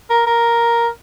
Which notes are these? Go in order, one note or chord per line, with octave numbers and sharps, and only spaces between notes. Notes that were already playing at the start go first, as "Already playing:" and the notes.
A#4
A#4